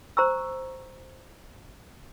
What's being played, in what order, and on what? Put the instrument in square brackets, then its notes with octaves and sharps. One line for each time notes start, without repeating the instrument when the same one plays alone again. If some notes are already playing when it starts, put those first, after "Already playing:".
[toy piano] C5 A#5 C#6 E6